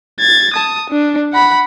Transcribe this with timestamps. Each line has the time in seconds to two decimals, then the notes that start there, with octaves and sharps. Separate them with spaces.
0.20 G#6 A6
0.54 A5 D#6
0.90 D4
1.33 F#5 B5